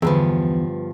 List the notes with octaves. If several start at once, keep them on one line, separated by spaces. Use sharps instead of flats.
E2 G2 D3 F3 B3 G#4